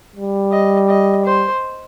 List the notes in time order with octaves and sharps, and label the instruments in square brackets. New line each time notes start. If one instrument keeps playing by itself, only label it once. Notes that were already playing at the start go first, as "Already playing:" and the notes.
[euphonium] G3
[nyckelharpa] D#5
D#5
C5